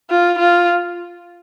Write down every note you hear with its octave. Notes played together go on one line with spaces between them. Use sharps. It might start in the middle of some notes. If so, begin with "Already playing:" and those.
F4
F4